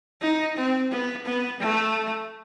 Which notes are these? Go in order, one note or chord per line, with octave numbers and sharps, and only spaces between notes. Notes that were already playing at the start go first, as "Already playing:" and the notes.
D#4
C4
B3
B3
A3